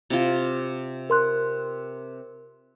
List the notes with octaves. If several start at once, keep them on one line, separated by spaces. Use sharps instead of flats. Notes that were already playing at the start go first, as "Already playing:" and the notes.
C3 F4
A#4 C6 F#6